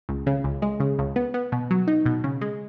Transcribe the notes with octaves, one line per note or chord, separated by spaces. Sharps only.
C#2
C#3
C#2
G#3
C#3
C#2
B3
B3
B2
F#3
D#4
B2
C#3
G#3